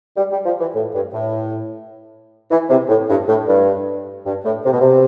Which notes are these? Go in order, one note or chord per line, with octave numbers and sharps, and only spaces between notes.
G3
G3
F3
E3
A2
G2
A2
E3
C3
A2
G2
A2
G2
G2
A2
C3
B2
C3